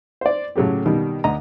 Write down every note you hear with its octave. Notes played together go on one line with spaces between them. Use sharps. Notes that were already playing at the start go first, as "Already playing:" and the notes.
C5 D5
A2 C#3 F#3 A3 G4
B2 D#3 G3
D2 D#5 A#5